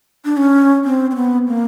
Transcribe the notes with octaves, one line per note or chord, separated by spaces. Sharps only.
D4
C#4
C4
C4
B3
A#3